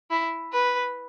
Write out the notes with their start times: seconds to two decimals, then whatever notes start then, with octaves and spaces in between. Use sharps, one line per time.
0.11 E4
0.53 B4